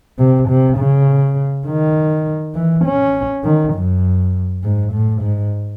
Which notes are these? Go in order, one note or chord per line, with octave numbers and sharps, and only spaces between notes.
C3
C3
C#3
D#3
E3
C#4
D#3
F#2
G#2
A2
G#2